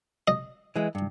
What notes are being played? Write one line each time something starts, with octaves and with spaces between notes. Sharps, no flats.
D#5
E3 G#3
G2